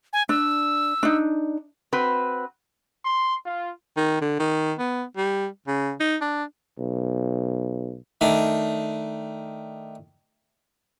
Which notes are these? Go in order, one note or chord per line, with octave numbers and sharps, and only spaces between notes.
G#5
D4 E6
D4 D#4
C4 F#4 B4
C6
F4
D#3
D3
D#3
B3
G3
C#3
D#4
D4
B1
D#3 A3 D4